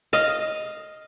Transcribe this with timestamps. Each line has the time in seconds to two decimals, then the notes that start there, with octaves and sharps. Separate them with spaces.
0.13 D#5 F5